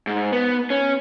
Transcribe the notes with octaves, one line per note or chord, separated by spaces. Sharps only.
G#2
B3
C#4